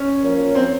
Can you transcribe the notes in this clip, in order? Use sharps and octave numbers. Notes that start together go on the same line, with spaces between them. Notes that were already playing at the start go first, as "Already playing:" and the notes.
Already playing: C#4
F3 A#3 F4 A#4 C#5
C4